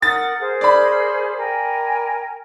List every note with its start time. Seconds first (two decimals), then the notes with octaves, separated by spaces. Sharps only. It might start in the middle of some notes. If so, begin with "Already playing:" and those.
0.02 A#4 F#5 D#6 A6
0.40 G#4 A#4 C5
0.61 D5 B5
1.37 A#4 G5 G#5